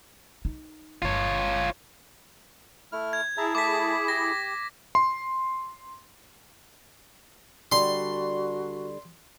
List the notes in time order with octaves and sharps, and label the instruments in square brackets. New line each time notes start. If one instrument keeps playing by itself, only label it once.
[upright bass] D#4
[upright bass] G1 [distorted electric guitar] F4 C#5
[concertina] A3 E4 F6
[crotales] G#6
[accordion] E4 G#4 [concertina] E5 A5 A#5
[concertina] A3 A5 [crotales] D6 B6
[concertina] G4 [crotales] A#6
[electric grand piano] C6
[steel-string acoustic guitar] D3 G3 [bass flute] F#4 [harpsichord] C6